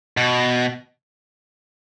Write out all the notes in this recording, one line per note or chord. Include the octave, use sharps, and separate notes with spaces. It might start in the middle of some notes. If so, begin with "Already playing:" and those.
B2